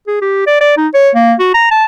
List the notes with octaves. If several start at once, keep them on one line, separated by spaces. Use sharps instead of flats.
G#4
G4
D5
D5
D#4
C#5
A#3
F#4
A#5
A5